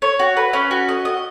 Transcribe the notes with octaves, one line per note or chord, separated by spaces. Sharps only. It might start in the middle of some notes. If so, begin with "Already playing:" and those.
C#5
F#4
B4
C#4
F#4
D#5
D#5